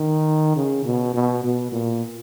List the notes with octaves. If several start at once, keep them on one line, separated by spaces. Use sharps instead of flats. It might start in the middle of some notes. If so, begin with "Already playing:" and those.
Already playing: D#3
C#3
B2
B2
B2
A#2